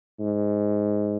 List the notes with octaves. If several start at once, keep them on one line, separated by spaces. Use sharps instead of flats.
G#2